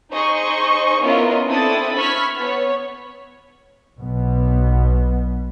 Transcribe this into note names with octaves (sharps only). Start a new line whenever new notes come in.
D#4 G#4 C5 D#5 C#6
B3 C#4 E4 F4 A#4 D#5
C4 D4 E4 A4 D#6 A6
B5 C#6 E6 F6 G#6 B6
B3 C#5
B1 B2 B3